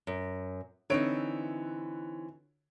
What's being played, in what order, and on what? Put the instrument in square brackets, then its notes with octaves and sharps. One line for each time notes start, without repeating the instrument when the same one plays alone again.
[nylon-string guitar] F#2
[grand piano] D3 C#5 D7 [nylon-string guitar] E3 C4 D#4